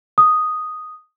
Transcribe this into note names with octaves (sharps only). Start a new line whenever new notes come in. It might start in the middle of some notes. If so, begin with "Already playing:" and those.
D#6